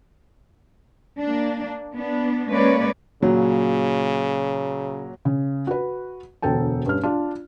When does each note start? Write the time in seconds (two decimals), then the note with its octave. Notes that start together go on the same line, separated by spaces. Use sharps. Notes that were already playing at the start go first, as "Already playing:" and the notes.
1.19 A#3 D4
1.94 B3 D4
2.51 G#3 A#3 C#4 B4 C#5 D5
3.22 A#2 C#3 F#3
5.25 C#3
5.67 F#4 B4
6.42 E1 D2 A4 G5 A5
6.86 G2 C#4 F6
7.03 D4 F4